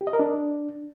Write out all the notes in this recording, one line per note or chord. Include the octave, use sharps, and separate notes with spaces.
G4
D#5
A#4
D4